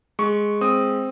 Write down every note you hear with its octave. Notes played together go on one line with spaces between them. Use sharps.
G#3 C#6
C4 D#6